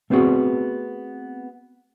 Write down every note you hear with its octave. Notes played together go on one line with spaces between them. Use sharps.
A3 B3 C4 D4 F#4 G#4